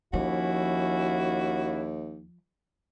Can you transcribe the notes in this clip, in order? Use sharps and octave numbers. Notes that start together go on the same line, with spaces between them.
D#2 F3 C#4 E4 F#4